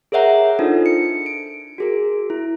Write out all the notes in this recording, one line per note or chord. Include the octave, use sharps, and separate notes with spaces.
G#4 A#4 C#5 E5 F#5 A#5
D4 D#4 F4 A4 C5
C#7
D7
F#4 G#4 A#4
E4